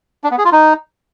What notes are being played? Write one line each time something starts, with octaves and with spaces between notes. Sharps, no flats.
D4
B3
G#4
F4
D#4